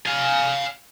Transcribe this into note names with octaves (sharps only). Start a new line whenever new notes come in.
F5 G#5